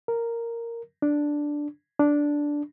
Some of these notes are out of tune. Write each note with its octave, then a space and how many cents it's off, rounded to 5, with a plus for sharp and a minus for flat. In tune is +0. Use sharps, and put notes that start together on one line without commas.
A#4 -5
D4 +0
D4 -5